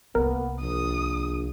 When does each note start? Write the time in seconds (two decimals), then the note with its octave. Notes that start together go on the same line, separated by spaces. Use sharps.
0.15 C2 A#3 B3 A#4
0.61 A#1 D#6